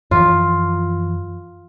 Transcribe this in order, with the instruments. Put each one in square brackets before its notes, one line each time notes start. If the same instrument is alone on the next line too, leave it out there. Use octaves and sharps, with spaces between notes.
[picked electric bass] F#2 E3 F3 [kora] F4